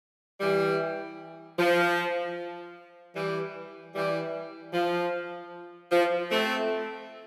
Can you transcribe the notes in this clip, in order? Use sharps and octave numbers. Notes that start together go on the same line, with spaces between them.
E3 G3
F3
E3 G3
E3 G3
F3
F3
A3 C4